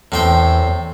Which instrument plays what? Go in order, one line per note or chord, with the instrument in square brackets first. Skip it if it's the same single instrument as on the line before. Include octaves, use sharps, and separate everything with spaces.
[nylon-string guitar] E2 [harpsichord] A2 C4 G5